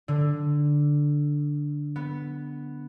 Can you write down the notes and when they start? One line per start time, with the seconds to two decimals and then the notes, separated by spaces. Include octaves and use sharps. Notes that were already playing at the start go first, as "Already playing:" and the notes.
0.08 D3
1.96 B3